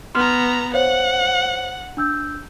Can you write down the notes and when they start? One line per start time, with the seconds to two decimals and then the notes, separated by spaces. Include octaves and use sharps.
0.15 B3 A#5 C6 F6
0.74 C5 C#5 F5 F#5
1.97 D4 E6 G6